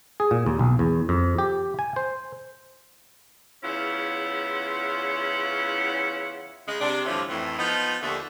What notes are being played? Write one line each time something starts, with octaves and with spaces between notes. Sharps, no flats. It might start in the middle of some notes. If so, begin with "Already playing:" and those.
G#4
A#2
D#2
B1
E2
F2
G4
G#5
C5
E2 C#3 C#4 E4 F4 F#5
C#3 G#3
C3 D4
G2 D3 E3 F3 A3 C#4
F2 A2 E3
F3 B3 D#4
D#2 D3 A3